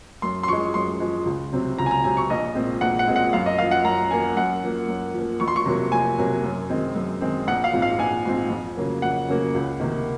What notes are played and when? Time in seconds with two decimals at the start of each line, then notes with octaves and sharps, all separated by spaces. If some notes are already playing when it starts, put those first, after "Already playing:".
0.22 F#2 C6
0.43 C6
0.48 F3 G#3 C#6
0.74 F#2 C6
1.00 F3 G#3
1.26 C#2
1.53 C3 F#3 C4
1.78 C#2 A#5
1.86 G#5
1.91 A#5
2.03 C3 F#3 C4 G#5
2.17 C#6
2.30 A#1 D#5
2.55 A#2 G#3 C4
2.81 A#1 F#5
2.99 F#5
3.07 A#2 G#3 C4
3.16 F#5
3.33 F#2 F5
3.46 D#5
3.59 F3 A#3 F5
3.71 F#5
3.85 F#2 A#5
4.11 F3 A#3 G#5
4.36 F#2 F#5
4.63 F3 A#3
4.88 F#2
5.14 F3 A#3
5.40 F2 C#6
5.48 C6
5.56 C#6
5.65 C3 F#3 A#3
5.92 F2 G#5
6.18 C3 F#3 A#3
6.44 F#2
6.70 D#3 G#3 C4
6.96 F#2
7.21 D#3 G#3 C4
7.47 A#1 F#5
7.64 F5
7.73 G#2 F3 C4
7.82 F5
7.98 A#1 G#5
8.25 G#2 F3 C4
8.50 F2
8.77 C#3 F#3 A#3
9.02 F2 F#5
9.28 C#3 F#3 A#3
9.54 C#2
9.80 C3 D#3 A#3